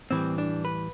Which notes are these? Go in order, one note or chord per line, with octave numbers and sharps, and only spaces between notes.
A2 E3 G3 C4
D4
B4